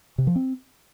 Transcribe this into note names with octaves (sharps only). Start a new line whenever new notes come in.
C3
F3
C4